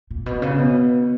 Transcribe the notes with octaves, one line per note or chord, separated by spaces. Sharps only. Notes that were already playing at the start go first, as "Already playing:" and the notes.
A#2
B2
C#3
B2